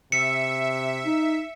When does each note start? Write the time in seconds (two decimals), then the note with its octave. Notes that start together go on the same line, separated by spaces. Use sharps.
0.12 C3 E5 C#7
1.06 D#4